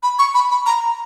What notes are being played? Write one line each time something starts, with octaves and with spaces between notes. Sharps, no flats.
B5
C#6
B5
B5
A#5